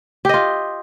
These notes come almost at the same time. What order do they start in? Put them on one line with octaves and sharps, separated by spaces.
G4 D#5 F4